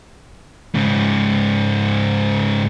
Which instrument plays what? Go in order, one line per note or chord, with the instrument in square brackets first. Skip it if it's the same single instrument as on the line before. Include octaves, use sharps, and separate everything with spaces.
[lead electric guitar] G#2 C#3